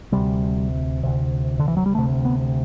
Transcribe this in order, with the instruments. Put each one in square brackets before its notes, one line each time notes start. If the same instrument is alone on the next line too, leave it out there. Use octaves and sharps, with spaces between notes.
[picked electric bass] D2 C3 G3
D2 C3
D3
E3
F#3
G3
D2 C3 A3
B3